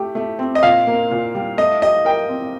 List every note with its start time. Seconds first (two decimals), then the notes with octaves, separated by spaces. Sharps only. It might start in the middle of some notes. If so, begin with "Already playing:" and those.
Already playing: A3 G4
0.15 A3
0.39 C4
0.55 D#5
0.63 A#2 F5
0.87 A#3
1.11 A#2
1.35 G3
1.57 A3 D#5
1.82 G4 D#5
2.05 A#4 G5
2.29 C4